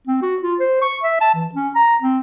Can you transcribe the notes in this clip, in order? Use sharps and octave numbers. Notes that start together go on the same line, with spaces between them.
C4
F#4
F4
C5
C#6
E5
A5
E3
C#4
A#5
C4